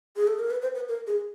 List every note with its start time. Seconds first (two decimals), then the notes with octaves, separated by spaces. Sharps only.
0.17 G#4
0.28 A4
0.39 A#4
0.51 B4
0.62 C5
0.75 B4
0.88 A#4
1.07 G#4